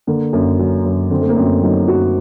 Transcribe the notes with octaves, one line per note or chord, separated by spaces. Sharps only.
D3 A#3
F#2 A#3
F#3
F#2
D3 C4
A3
A#3
F#2 C4
F#3 D#4
F#2 F#4